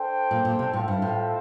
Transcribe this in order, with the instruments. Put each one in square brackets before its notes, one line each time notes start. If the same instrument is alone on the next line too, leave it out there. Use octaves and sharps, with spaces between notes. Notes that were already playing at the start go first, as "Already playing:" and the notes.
Already playing: [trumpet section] D4 A4 C5 G5
[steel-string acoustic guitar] A#2
A#2
C3
[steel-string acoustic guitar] A2 [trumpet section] C4 F4 A4 E5 G5
[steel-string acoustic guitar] G2
A2